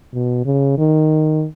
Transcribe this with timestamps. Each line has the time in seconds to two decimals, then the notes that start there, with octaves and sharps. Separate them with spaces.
0.14 B2
0.45 C#3
0.78 D#3